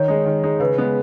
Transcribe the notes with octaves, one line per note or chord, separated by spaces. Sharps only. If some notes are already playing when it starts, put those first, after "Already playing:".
Already playing: D#3 C#5
G#3 D#4
D#3
G#3 D#4
C#3 B4
G#3 B3